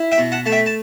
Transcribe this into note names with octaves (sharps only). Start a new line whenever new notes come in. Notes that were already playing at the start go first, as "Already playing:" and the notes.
Already playing: E4
E5 G5
B2
F#5 A5
A3 A5
E5 G5
A5